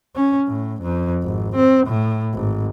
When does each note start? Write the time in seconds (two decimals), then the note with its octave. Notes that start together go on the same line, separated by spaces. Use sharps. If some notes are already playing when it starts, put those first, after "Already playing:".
0.15 C#4
0.48 A2
0.82 F2
1.23 G#1
1.56 C4
1.87 A2
2.33 G#1